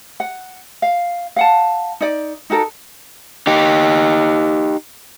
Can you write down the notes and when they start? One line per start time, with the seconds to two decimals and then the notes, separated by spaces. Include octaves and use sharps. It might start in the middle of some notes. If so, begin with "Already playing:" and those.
0.20 F#5
0.82 F5
1.36 F5 F#5 A5
2.01 D#4 D5
2.50 D#4 F#4 A4 A#4
3.47 D#4 G4